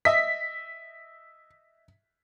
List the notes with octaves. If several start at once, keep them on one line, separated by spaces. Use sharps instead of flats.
D#5 E5 B6